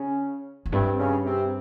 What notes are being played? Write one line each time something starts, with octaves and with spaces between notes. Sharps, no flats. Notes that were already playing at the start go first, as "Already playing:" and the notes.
Already playing: C#3 C#4
F2
G2 C3 C4
C#3 C#4
C3 C4